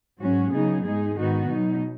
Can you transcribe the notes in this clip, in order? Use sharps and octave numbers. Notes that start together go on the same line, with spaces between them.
G#2 F#3 C#4 F#4
C#3 F#3 B3 D#4 G#4
G#2 G#3 D#4 G#4
G#2 D#3 B3 D#4 F#4
B2 F#3 D#4